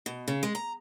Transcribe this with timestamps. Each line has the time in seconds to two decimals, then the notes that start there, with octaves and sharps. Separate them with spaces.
0.06 B2
0.28 C#3
0.43 G#3
0.55 A#5